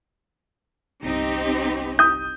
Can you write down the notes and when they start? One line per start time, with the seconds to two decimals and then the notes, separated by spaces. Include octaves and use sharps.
1.03 G1 C2 C4 D#4 G4
1.99 D#6 G6